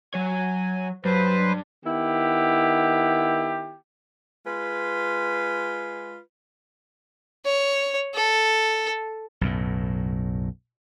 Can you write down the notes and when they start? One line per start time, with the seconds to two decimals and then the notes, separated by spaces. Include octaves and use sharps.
0.14 F#3 C#5 G#5
1.05 G2 F#3 B4 C5
1.85 D#3 B3 E4 G4
4.46 G#3 F4 B4
7.46 C#5
8.15 A4
9.41 B1 F#2 A2